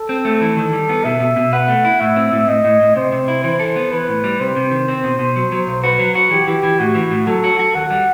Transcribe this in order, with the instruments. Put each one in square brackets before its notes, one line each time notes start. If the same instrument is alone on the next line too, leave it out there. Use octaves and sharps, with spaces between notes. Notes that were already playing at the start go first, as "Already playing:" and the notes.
Already playing: [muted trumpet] A4
[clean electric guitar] C4
A3
E3
D#3
G3
B3
[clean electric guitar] B2 [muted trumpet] E5
[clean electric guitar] B2
B2
[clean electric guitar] B4 [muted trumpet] F#5
[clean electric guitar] A3
E4
[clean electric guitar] A2 [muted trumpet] E5
[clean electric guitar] C4
A2
[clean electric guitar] A2 [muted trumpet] D#5
[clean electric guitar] A2
A2
[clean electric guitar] C3 [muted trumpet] C5
[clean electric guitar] C3
E4
[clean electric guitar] E3 [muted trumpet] C5
[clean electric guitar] A4
B3
[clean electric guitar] E3 [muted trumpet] B4
[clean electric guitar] A2
G3
[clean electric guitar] C3 [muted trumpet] C5
[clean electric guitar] C3
D#3
C4
B2
B2
F#3
F#3
B1
[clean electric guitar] F#4 [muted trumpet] B4
[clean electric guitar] F#3
F#4
[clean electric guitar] E3 [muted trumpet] G4
[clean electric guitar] E3
E3
[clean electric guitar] A2 [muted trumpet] F#4
[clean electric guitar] E3
A2
[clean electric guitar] F#3 [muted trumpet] A4
[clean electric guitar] F#4
F#4
[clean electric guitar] D#2 [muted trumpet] F#5
[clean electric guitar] G3